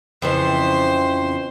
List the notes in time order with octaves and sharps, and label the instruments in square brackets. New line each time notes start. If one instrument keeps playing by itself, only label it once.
[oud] F2 C#3 E3 [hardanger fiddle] C5